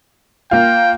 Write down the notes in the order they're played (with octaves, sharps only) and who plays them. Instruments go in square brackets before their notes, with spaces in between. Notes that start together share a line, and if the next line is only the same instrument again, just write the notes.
[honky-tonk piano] A#3 F4 [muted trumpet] G5